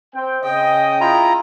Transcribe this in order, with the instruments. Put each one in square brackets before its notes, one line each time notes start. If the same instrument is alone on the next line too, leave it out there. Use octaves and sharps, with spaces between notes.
[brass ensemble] C4 G5
[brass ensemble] C#3 D#5 [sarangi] G5
[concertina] E4 F4 A#5